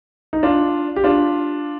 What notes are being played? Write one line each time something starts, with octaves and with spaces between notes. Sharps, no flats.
D#4
D4 F4
G4
D4 F4